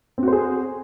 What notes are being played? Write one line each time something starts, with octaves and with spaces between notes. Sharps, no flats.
C4 F#4 G#4 C5